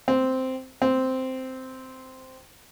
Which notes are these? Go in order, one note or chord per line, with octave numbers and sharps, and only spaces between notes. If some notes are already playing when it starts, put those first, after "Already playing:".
C4
C4